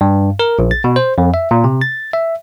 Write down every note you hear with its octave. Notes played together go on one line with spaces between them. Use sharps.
G2
A#4
A#1
A6
B2
C5
F2
E5
A#2
C3
A6
E5